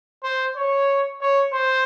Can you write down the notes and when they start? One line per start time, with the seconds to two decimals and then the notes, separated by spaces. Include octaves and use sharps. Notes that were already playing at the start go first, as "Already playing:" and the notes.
0.23 C5
0.56 C#5
1.21 C#5
1.53 C5